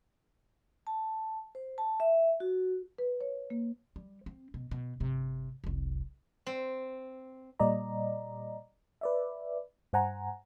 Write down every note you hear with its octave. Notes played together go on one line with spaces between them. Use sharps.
A5
C5
A5
E5
F#4
B4
C#5
A#3
G3
C4
B2
B2
G1 C3
F1 C2
C4
A#2 G3 D5 D#5 A#5
B4 D5 E5
G2 C5 F#5 G#5 A#5